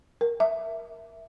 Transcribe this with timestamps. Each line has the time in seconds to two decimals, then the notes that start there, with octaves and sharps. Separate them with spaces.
0.21 A#4
0.40 E5